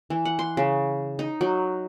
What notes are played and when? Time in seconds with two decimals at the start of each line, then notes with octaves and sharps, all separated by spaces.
0.10 E3
0.25 F#5
0.39 C6
0.57 C#3
1.19 D#4
1.41 F#3